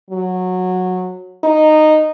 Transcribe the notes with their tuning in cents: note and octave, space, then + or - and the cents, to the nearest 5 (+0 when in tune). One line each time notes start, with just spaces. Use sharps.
F#3 -15
D#4 -10